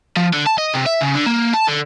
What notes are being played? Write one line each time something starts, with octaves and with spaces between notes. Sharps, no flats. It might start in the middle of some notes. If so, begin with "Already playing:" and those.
F3
D3
A5
D#5
C3
E5
C#3
D3
A#3
A5
D3